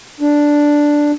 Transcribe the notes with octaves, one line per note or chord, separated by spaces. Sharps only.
D4